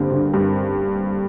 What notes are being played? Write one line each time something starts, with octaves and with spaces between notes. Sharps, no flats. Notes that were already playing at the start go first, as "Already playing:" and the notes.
Already playing: G2 D3 A#3 C4
D3
G2